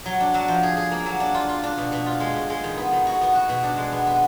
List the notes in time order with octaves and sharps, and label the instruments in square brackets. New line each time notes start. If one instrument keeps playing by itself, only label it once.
[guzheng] F#3
D4
F#3
F3
G#4
G#4
A#3
F#3
D4
F4
F4
D4
B2
B2
F4
G#3
B2
G#3
D#3
B3
D#3
F#4
B3
F#4
B2
D4
G#3
B3
B3